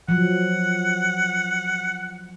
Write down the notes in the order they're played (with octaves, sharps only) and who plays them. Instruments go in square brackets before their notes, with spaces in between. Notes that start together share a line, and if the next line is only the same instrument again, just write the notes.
[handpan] F3 F#3 [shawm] F#5